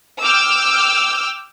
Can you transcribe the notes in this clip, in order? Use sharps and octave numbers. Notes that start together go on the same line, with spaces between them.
G5 D6 E6 F6 G6